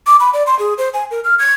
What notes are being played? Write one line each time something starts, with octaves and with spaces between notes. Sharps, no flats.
D6
B5
D5
C6
G#4
C5
G#5
A#4
F6
G#6